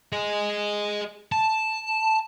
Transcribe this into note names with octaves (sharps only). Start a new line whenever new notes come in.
G#4 D#5
A5